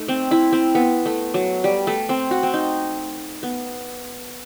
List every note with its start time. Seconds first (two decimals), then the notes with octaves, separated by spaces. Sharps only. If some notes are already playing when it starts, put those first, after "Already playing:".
Already playing: A3 D#4
0.08 C4
0.31 E4
0.53 C4
0.75 B3
1.06 A3
1.34 F#3
1.64 G3
1.87 A3
2.09 C4
2.31 F#4
2.43 C4
2.54 D#4
3.43 B3